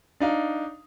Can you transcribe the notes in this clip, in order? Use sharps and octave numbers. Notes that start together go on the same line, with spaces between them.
D4 D#4 F5